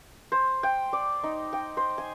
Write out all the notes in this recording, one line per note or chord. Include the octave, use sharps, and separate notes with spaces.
C5
G5
D5
D#4
G5
C5
G#5